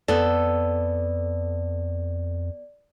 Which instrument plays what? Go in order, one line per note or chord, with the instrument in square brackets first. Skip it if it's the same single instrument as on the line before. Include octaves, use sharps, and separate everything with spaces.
[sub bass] F2 [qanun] B3 A4 [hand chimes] D5